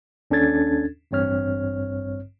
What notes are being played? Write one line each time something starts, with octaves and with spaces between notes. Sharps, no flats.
D#2 C#4 D4 A4 G#6 A6
A1 G2 C4 C#5 F6